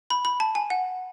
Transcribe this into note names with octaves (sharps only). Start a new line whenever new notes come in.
B5
B5
A5
G#5
F#5